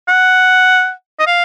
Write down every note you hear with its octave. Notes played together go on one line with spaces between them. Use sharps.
F#5
D#5
F5